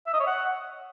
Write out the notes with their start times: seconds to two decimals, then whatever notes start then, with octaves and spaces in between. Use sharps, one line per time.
0.07 E5
0.14 D#5
0.20 C#5
0.27 F#5